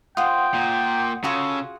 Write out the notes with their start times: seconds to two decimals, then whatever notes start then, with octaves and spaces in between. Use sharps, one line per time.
0.17 F4 C5 F#5 G5 C6 D#6
0.54 A#2
1.24 C#3 F4 F#4 G#4 A4